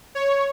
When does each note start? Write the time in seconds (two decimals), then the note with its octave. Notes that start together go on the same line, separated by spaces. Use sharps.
0.15 C#5